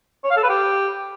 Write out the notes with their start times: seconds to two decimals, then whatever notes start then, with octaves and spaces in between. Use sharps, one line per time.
0.24 C#5
0.30 F5
0.37 A4
0.43 B4
0.49 G4